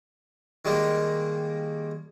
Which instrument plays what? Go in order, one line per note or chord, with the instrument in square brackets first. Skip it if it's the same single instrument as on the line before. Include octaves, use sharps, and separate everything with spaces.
[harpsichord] D#3 G3 G#3 A#3